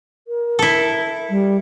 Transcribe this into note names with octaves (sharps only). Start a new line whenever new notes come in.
A#4
E4 A4
G3